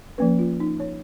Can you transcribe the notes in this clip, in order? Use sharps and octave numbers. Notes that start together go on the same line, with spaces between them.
F3 A#3 C#4 B4
F4
D#4
C#5